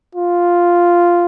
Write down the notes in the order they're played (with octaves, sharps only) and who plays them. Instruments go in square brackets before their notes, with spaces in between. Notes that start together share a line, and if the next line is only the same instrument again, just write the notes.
[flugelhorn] F4